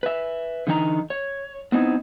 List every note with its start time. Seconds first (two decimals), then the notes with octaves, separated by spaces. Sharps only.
0.03 B4 E5
0.67 D3 E3 D#4 G5 A#5
1.10 C#5
1.72 B3 C4 D#4 E4